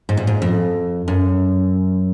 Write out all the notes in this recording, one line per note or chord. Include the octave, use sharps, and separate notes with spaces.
G#2
A#2
G#2
F2
F#2